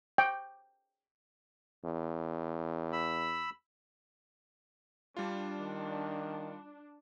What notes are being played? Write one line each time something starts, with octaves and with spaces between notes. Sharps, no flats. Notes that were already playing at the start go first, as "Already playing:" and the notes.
G5
E2
B5 E6
G3 D4 F4
D#3